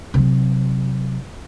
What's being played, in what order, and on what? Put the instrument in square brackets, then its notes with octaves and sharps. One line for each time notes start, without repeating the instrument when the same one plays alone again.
[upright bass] C3 F#3